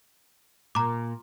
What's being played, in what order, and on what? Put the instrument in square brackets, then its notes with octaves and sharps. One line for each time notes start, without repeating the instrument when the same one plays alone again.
[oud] A#2 [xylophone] A#5 D6